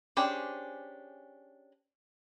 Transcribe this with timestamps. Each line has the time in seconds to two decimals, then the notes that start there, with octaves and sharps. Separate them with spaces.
0.17 C#4 D4 G4 G#4 C5